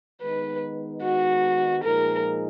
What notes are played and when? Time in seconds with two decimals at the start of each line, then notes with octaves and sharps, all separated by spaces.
0.22 D#3 G#3 B3 D#4 B4
1.03 F#4
1.83 A#2 F3 G#3 D#4 G#4 A#4